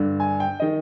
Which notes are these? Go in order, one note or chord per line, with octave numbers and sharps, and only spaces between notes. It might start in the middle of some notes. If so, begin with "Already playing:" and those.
Already playing: G2 D3
G#5
G5
D#3 D#5